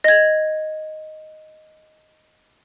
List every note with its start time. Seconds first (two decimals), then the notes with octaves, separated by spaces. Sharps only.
0.04 D#5 G#6